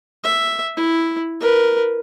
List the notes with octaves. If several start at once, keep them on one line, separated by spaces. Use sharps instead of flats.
E5
E4
A#4 B4